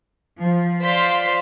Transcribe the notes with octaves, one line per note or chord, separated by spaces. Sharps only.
F3
F3 C5 D5 F5 C6 B6